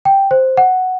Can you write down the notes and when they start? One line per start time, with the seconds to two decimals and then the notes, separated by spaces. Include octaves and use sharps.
0.05 G5
0.31 C5
0.57 F#5